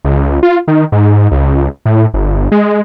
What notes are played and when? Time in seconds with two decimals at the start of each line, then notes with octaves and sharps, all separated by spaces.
0.05 C#2
0.43 F4
0.68 D#3
0.92 G#2
1.32 C#2
1.86 A2
2.14 G1
2.52 G#3